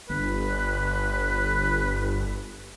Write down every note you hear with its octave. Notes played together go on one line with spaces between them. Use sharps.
G1 B4